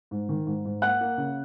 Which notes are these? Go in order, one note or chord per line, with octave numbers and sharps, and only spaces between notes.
G#2
D#3
G#2
G#2
A#3 F#5 F#6
A#3
C#3